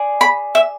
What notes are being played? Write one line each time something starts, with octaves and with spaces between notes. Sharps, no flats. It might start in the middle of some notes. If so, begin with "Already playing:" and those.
Already playing: G#4 D5
B5
E5